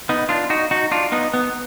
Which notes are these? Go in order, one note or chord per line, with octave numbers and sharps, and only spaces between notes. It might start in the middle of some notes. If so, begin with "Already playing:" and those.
B3 D#4
D4 F4
D#4 F#4
D#4 F#4
D4 F4
B3 D#4
B3